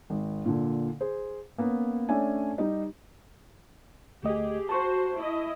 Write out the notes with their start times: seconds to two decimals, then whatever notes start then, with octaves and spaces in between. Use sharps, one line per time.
0.10 G#1
0.46 A#2 D3
1.01 G#4 C5
1.58 A#3 B3 C#4
2.09 A3 C#4 D4 D5 E5 G#5
2.58 G3 D#4 G4 D#5
4.23 D2 A3 G4 G#4 D#5
4.69 F#4 C5 A5 C#6
5.16 E4 D#5